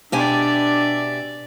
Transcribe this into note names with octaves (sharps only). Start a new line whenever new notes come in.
B2 D4 G4 D5 E5 G#5